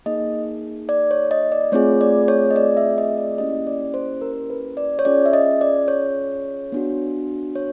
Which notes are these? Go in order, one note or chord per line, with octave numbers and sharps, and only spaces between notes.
A#3 D#4 G#4 D#5
D5
C#5
D#5
D5
A3 C4 F4 G#4 C#5
D5
C#5
D#5
D5
E5
D#5
D5
A#3 C#4 E4 G4 D#5
D5
C5
A#4
B4
D5
C#5
C#4 F4 G#4 D5
E5
D#5
D5
C#5
B3 D4 F#4
C#5